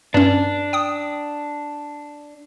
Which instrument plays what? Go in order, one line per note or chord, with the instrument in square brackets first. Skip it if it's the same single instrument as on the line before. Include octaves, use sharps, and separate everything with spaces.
[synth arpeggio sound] G2 C#4 [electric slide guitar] D4
[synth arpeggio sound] G5 D#6